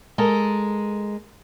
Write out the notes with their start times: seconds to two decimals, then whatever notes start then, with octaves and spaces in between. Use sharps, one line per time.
0.18 G#3 A4 A#4